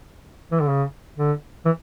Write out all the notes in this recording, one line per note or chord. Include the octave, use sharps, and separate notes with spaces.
E3
D3
C#3
D3
E3